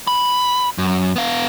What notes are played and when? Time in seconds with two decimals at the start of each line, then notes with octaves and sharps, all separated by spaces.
0.07 B5
0.78 F#2
1.16 B3 F5